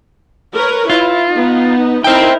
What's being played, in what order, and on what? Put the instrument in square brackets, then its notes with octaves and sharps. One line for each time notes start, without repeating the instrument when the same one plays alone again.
[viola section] A#4 B4 C#5
[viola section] E4 [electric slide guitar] F4
[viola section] B3 D#4
[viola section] D#4 E4 A#4 [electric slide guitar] C5 G5